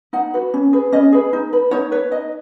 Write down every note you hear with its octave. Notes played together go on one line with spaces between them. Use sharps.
D#4 F#5
F#4 B4
C#4
G#4 B4
C#4 D#5
G#4 B4
D#4
B4
D#4 C#5
B4 C#5
D#4 D#5